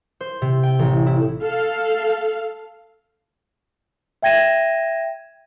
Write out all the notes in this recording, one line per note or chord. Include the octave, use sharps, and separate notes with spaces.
C5
C3
G5
A1
E4
A4 F5
E5 G5 G#6 A#6 D#7 E7